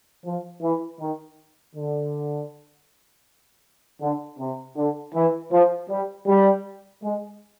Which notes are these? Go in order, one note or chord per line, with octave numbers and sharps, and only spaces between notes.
F3
E3
D#3
D3
D3
C3
D3
E3
F3
G3
G3
G#3